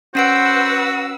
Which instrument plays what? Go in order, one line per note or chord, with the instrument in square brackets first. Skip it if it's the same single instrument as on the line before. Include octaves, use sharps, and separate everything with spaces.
[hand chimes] C#4 C7 D7 [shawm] F#4 [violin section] B4 F#5 E6 [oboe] C5